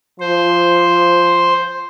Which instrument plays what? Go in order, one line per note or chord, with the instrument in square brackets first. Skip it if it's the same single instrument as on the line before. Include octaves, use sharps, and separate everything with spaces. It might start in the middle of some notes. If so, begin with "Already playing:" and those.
[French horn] F3 [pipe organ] C5